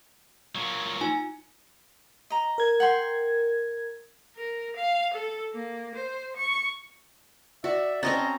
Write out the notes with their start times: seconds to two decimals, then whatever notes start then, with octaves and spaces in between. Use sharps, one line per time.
0.55 A#2 F#3
1.01 D#4 F4 G#5
2.30 D#5 A#5
2.58 A#4 G#6
2.80 F#5 G5 C6
4.36 A#4
4.76 F5
5.13 A4
5.53 A#3
5.95 C5
6.36 C#6
7.64 F#4 D5 E5
8.03 C4 C#4 D#5 A5 A#5